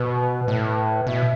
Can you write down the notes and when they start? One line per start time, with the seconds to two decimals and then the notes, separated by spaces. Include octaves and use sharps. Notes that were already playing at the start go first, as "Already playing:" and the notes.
Already playing: B2 B4
0.48 A2
1.06 B2 E5